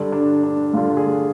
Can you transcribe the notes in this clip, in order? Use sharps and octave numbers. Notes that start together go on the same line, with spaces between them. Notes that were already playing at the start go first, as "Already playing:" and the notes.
Already playing: G2 D3
D4
D4
G2 D3 F4
G#4